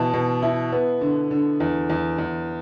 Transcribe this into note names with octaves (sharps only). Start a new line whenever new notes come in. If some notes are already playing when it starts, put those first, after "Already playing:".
Already playing: B2 E3 A5
B2
E4
B3
D3
D3
E2
E2
E2